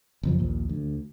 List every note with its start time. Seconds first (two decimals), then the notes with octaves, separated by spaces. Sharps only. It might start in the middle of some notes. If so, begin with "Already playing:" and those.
0.23 F#1 F2 F3
0.39 A#1 D#2 A#2
0.69 D2